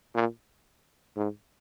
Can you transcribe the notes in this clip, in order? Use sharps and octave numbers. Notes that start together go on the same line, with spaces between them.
A#2
G#2